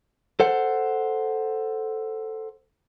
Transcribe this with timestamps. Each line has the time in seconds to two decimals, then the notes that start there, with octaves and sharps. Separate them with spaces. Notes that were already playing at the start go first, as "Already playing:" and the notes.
0.40 A4 C5 F#5